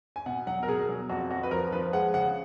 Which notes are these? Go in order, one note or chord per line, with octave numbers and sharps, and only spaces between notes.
G#5
B2 F#5
F#3 F#5
A#4
B2 G#4
F#3
F2 F#4
F2 F#4
B4
F3 A#4
F3 B4
G#3 F#5
C#3 F#5